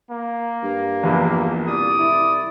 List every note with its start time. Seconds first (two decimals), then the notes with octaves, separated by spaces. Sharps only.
0.11 A#3
0.63 G2
1.03 A#1 E2
1.68 C2 D5 D#6
1.99 E4